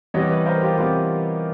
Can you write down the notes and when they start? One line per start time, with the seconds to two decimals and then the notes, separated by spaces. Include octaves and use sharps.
0.14 C3 E3 G3 B3 C#5 D#5
0.30 B4 C#5
0.46 A#4 C5
0.62 F4 G4
0.78 C3 E3 G3 B3 F4 G4